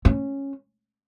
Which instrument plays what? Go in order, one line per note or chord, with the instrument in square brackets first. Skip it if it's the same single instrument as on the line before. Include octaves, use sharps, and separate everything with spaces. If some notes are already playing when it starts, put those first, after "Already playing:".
[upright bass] C#4